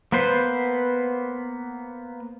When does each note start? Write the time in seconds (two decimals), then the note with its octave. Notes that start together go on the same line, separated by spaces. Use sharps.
0.12 A#3 B3 B4 C5